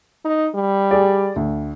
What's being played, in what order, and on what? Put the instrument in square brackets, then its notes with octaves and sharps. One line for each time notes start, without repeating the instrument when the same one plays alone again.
[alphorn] D#4
G3
[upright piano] G4 G#4 D5
D2